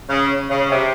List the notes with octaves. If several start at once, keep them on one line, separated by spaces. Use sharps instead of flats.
C#3
C#3
C3